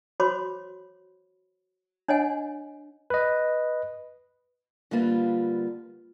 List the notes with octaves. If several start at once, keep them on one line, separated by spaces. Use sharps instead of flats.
F#4 C5 C#5 B5 C6 D6
D4 C#5 D#5 F#5 G#5
B4 D#5
D3 G3 A#3 F4 B4